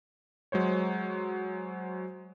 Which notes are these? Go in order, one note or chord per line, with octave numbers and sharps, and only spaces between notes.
F#3 G#3 C5 C#5